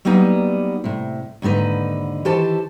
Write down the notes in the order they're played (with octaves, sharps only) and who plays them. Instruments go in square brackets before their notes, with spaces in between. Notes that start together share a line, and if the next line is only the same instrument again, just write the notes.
[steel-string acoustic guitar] F#3 G3 A#3 B3 D#4
A2 C3
D#2 G#2 D3 D#4 B4
D#3 E3 G4 A4 C5 A5